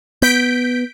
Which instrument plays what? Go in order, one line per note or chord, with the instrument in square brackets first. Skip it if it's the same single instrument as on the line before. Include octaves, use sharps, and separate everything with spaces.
[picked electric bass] B3 [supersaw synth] G6 B6 D7